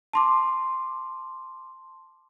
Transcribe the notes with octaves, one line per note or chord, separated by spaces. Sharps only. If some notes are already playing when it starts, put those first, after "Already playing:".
A5 C6 D6